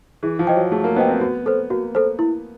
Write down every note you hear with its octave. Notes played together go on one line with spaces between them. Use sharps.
E3 G#4
F3
C5 D#5 G5
F#3
A3 G#4
A#3
B3 C5 D#5 G5
C4
B3 F#4
A4 C5
A#3 F#4
A4 C5
E4